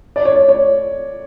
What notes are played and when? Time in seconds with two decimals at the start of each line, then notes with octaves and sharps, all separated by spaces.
0.16 D5
0.25 C#5
0.36 D5
0.49 C#5